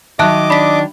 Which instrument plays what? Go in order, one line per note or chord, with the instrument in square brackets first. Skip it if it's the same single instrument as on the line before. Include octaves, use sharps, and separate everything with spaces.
[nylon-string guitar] D#3 F#3 [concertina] D#5 D6 [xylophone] E5 A5 F#6
[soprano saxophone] D4 [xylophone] B5 B6